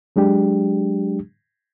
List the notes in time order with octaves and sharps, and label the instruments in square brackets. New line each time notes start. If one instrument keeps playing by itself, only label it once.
[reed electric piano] F#3 G#3 D4 G4